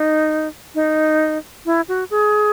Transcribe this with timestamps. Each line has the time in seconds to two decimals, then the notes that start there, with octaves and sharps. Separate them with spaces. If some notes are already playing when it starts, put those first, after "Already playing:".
Already playing: D#4
0.75 D#4
1.66 E4
1.88 F#4
2.11 G#4